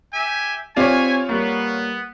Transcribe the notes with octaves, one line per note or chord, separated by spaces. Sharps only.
G4 E5 G#5
C4 F4 G4 C#5 D5 E5 G#5
G3 A#3 B3